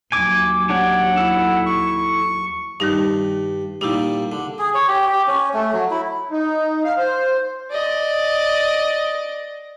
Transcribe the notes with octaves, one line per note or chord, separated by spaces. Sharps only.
D#2 F#3 G#5 D6
D4 G4 C#5 F#5
E4 A4
C#6
G2 D#3 G3 D#4
A#2 G3 D#4 E4 G4
D3
G#4
C#5
G4
G4
C#4
A3
F#3
E4
D#4
F5
C5
D5 D#5